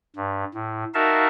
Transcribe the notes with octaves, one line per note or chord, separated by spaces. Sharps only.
G2
A2
D#4 F#4 A#4 E5 F5 A5